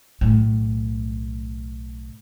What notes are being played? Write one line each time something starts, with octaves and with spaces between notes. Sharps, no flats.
B1 A2